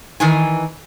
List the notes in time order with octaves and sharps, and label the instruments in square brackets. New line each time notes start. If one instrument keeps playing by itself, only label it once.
[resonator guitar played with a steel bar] D#3 E3 G#5